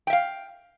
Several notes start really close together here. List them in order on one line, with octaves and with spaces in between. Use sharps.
G5 E5 F5